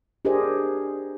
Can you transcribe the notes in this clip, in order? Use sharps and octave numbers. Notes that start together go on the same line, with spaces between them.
D4 G4 G#4 A#4 C5 D#5